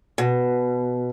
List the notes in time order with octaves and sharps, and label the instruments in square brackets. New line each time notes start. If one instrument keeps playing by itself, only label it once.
[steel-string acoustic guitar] B2